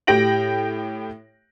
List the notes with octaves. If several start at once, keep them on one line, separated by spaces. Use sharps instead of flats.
A2 G4 G5 A#6 D7 F#7